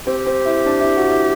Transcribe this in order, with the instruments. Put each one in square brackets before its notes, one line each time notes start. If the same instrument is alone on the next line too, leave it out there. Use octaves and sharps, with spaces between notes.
[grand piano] C4 [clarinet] G4
[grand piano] C4
E4
D4
E4
F#4
E4